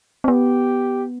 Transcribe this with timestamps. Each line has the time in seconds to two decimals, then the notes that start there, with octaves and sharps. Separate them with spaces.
0.24 C4
0.28 B3 G4